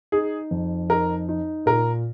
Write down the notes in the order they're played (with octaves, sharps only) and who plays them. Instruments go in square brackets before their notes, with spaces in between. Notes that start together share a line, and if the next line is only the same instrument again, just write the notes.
[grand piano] D#4 [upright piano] G#4
[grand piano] F2
[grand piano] D#4 [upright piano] A#4
[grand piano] D#4
[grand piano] A#2 [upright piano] A#4